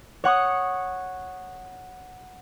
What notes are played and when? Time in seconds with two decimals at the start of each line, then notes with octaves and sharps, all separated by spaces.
0.24 C#5 F#5 C#6 D#6